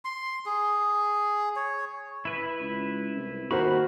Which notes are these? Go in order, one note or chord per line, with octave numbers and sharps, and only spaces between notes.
C6
G#4
C#5
E4 B4 E5
C#2
C2
D#2 F#4 A#4 C5 B5